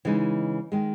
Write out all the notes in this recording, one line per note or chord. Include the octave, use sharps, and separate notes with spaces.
C#3 E3 G#3 D#4
D#3 G#3